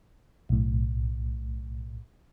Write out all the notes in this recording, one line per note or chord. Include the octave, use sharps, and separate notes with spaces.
B1 A2